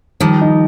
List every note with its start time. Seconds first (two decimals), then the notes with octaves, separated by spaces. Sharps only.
0.20 D#3 F3 G3
0.41 D#4